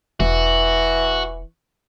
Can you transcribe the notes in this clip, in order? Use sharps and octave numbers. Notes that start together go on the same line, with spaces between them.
E1 E3 F#4